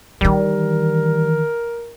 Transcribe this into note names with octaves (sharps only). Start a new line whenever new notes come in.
D#3 E3 G3 A#4